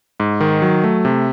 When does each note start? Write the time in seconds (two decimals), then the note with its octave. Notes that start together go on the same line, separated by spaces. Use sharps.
0.20 G#2
0.40 D#3
0.62 F#3
0.84 A3
1.05 C3